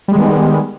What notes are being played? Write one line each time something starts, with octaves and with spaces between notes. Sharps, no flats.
D#3 G3 G#3 B3